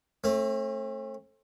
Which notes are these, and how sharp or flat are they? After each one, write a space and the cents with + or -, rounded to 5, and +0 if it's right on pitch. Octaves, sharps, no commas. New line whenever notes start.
A3 +0 C4 +45